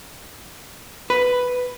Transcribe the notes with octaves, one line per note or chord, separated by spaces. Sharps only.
B4